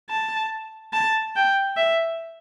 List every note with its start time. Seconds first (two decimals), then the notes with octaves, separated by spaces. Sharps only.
0.10 A5
0.93 A5
1.36 G5
1.77 E5